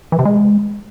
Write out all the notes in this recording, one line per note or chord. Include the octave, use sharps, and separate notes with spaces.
E3
C3
G#3